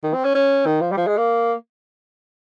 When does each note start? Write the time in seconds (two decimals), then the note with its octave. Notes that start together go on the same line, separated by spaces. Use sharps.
0.04 D#3
0.14 C4
0.25 C#4
0.35 C#4
0.66 D#3
0.81 F3
0.92 G3
0.97 F3
1.07 G#3
1.17 A#3